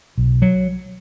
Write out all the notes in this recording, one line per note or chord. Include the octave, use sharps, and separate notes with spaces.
B1
F#3